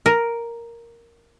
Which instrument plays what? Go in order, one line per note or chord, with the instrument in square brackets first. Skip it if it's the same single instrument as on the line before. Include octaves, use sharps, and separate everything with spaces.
[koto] A#4